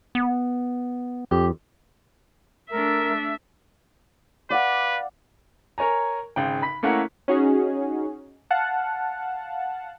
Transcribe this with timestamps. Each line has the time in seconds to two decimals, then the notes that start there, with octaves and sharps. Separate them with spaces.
0.15 B3
1.31 F2 G4
2.72 A3 D4 A#4 E5
4.50 B4 D5 F5 F#5
5.78 A#4 C#5 G#5 A#5
6.36 G#1 C#3 G5
6.62 B5 B6
6.83 A3 A#3 C#4 E4 A#4 F#5
7.28 C#4 D#4 F#4 G#4
8.50 F5 F#5 A5